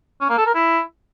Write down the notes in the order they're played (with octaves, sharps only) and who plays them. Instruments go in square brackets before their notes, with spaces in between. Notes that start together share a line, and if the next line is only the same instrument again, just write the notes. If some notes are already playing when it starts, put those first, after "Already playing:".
[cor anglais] C#4
A#3
A4
A#4
E4